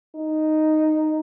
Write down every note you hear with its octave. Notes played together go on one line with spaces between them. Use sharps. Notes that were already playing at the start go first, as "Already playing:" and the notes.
D#4